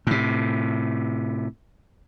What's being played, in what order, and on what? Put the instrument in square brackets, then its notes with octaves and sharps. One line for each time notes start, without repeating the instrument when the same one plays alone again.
[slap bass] A2 C3